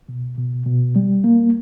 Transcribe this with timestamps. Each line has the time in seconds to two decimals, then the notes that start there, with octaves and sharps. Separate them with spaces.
0.09 B2
0.38 B2
0.66 B2
0.96 G3
1.24 A#3